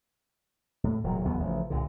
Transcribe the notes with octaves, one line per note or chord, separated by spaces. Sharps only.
A2
E1 A#2 F#3
F#1 E2 B3
A1 C#3 F3
C2 A#2 D3